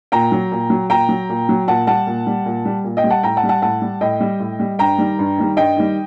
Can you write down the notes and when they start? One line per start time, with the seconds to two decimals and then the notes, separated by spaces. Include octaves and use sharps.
0.12 A#2 G5 A#5
0.32 F#3
0.52 A#2
0.70 F#3
0.90 A#2 G5 A#5
1.09 F#3
1.29 A#2
1.49 F#3
1.68 A#2 F#5 A5
1.87 G3 F#5 A5
2.07 A#2
2.27 G3
2.46 A#2
2.65 G3
2.84 A#2
2.97 D#5 G5
3.04 G3
3.10 F#5 A5
3.23 A2 G5 A#5
3.37 F#5 A5
3.43 G3
3.49 F#5 A5
3.62 A2 F#5 A5
3.82 G3
4.01 A2 D#5 G5
4.21 G3
4.40 A2
4.60 G3
4.79 G2 G5 A#5
4.99 D#3 G3
5.19 G2
5.38 D#3 G3
5.56 G2 D#5 G5
5.76 D#3 G3